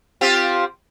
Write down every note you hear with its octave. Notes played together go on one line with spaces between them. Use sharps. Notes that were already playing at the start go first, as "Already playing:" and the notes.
C4 F4 G4